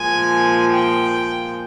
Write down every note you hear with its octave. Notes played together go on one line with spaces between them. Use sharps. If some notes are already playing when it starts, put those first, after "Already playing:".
Already playing: A#2 F3 G#3 G#5
G5